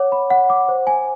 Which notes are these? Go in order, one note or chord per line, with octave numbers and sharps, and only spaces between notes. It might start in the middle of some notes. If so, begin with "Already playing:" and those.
Already playing: C#5 F#5 D6
B5
F#5
D6
C5
G#5